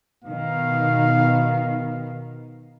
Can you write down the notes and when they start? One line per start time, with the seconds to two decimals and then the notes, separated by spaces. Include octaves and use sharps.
0.24 B2 D#3 F5